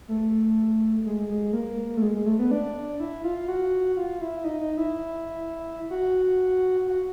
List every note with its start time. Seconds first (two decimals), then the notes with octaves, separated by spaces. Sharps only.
0.08 A3
1.06 G#3
1.29 G#3
1.53 A#3
1.97 A3
2.02 G#3
2.14 G#3
2.26 A3
2.39 B3
2.51 D4
3.00 E4
3.24 F4
3.48 F#4
3.97 F4
4.21 E4
4.44 D#4
4.60 D#4
4.77 E4
5.90 F#4
6.87 F#4